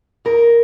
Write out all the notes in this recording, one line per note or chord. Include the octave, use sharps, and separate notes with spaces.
E2 A#4